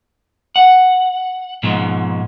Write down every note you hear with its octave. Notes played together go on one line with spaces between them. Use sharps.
F#5
G#2 B2 F3 G#3